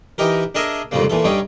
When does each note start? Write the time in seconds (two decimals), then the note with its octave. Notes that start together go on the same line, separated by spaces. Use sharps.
0.18 E3 D#4 G4 A#4
0.55 D4 G#4 A#4 D#5 E5
0.91 C2 F2 G#2 C#3 A#3
1.10 A#2 E3 A4
1.24 G2 G3 C#4 D#4